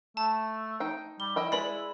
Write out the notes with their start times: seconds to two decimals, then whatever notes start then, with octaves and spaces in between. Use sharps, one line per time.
0.17 A3 A5
0.80 D#4 G5
1.20 G3 G7
1.36 E4 D#5 G5 B5
1.52 G#3 B4 D5 B5